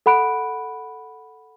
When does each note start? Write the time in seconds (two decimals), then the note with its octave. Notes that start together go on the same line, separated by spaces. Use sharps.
0.06 A4 F#5 B5 F#6 D7